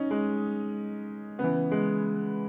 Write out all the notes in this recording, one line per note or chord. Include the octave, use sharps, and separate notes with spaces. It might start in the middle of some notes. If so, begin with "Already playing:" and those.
Already playing: C#4 D#4
G#3
C#3 B3
E3
G#3